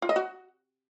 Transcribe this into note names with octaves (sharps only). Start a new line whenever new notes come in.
F4
D#5
F#4